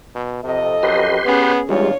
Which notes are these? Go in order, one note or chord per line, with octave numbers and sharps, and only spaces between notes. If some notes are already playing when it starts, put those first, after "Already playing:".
B2
F2 C3 A4 D#5
F#2 G4 B4 C6
B3 C#4 G#4
E2 G3 G#3 D4 F4 C#5